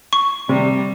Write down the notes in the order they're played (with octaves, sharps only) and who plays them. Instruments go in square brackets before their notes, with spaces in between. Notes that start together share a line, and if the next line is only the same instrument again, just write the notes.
[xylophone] C#6
[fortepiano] C3 [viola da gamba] G3